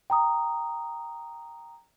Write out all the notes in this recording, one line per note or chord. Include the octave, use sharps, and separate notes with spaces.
G5 A#5 D#6